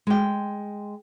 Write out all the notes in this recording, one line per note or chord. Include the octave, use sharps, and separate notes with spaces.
G#3 G5